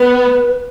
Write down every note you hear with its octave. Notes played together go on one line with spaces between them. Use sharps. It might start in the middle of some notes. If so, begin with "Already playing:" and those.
Already playing: B3 B4